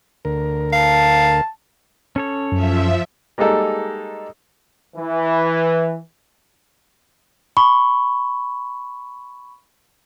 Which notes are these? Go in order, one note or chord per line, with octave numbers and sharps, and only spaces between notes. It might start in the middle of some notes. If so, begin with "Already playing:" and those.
D2 A#4
F5 A5
C#4 A4 C#5
F#2 F3 E5
G3 G#3 A#3 D#4 A4
E3
B5 C#6